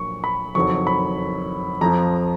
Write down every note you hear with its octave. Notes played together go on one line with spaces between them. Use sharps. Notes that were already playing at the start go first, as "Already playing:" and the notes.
Already playing: A#1 A#2 F#3 C#6
B5
F#1 F2 D#3 F#3 C#6
B5
F2 F3 A#5